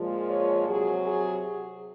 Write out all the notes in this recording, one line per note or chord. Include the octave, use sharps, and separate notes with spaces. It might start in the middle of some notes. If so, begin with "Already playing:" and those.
Already playing: A#2 F3 G#3
C#5
C3 F#3 G#4
G#4